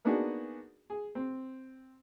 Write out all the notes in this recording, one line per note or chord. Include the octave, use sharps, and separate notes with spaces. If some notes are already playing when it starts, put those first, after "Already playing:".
A#3 B3 D4 D#4 F#4 G#4
G#4
C4